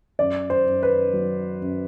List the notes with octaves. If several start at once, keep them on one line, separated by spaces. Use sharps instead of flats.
F#2 D5
C5
F#2
B4
F#3
F#2